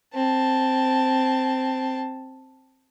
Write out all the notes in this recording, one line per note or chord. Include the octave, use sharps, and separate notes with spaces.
C4 A5